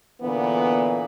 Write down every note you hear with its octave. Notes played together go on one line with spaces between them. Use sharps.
A#2 D3 E3 B3